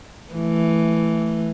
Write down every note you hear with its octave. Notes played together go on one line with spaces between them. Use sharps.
E3 A3